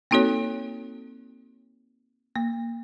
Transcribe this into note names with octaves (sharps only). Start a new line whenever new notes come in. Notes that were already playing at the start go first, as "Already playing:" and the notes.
A#3 C4 D#4 F#4 A4 C#5
A#3